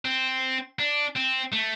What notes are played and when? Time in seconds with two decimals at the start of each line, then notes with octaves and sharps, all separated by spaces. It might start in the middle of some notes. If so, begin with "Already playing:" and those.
0.05 C4
0.79 D4
1.16 C4
1.52 A3